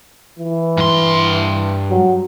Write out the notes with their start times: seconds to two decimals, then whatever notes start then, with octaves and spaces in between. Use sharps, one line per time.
0.39 E3
0.77 G2 C6
1.90 F#3